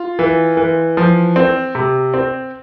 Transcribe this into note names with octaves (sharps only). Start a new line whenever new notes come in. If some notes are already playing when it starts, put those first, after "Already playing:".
Already playing: F4
E3
E3
F3
C4
C3
C4